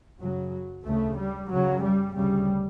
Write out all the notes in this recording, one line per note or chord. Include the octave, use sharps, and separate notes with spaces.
F#2 C#3 F#3
D2 C#3 A3
G3
F#2 C#3 F#3
G3
D2 C#3 G3